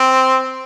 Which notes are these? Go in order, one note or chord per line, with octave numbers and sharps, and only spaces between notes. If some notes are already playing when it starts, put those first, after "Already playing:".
Already playing: C4